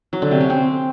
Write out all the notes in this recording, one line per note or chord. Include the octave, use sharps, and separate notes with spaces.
F#3
D3
C3
C#4
C4